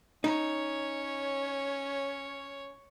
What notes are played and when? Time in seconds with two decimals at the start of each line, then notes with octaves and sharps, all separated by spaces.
0.24 C#4 D#4 C#5